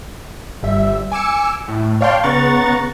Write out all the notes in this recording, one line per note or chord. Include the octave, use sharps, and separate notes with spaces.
G1 G3 E5
G#5 D6 E6 C#7
A2
C#5 D5 F5 G5 A5 C6
C#3 B3 A#5 C#6 F#6 A6